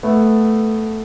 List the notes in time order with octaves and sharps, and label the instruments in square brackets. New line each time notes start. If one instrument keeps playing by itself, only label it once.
[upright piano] A3 B3